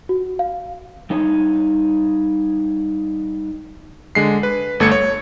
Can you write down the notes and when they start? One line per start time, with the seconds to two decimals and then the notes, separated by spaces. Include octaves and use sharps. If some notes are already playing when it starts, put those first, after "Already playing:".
0.09 F#4
0.39 F5
1.10 G3 D#4 C#5
4.15 D3 G#3 C7
4.43 B4
4.80 G1 A3 G#6 C#7
4.92 C#5